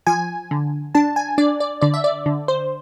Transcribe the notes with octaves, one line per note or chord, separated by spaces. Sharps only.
F3 G#5
D3
D4 A5
G#5
D4 D5
D5
D3 D5
E5
D5
D3
C5